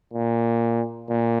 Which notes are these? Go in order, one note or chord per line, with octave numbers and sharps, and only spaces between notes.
A#2
A#2